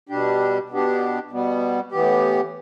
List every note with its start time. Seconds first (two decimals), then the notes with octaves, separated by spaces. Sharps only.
0.09 B2 G3 D4 G4
0.70 B2 B3 D4 G4
1.31 B2 G3 B3
1.92 A2 E3 B3 G4